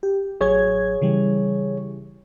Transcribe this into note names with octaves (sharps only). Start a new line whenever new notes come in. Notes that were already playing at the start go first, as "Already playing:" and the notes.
G4
A1 F#3 G#4 C#5 G#6
C#3 E3 G3